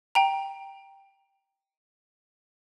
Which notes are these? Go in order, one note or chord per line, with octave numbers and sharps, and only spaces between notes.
G5 A#5